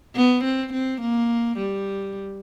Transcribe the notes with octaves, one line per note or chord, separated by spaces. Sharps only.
B3
C4
C4
A#3
G3